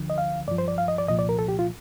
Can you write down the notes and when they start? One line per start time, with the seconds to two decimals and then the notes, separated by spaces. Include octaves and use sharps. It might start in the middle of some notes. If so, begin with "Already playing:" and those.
Already playing: D2 D3 F3
0.10 D#5
0.18 F5
0.48 G2 F3 D5
0.58 C5
0.68 D5
0.78 F5
0.88 D#5
0.98 D5
1.08 C2 A#2 F3 D#5
1.19 D5
1.29 A#4
1.39 A4
1.48 G4
1.59 F4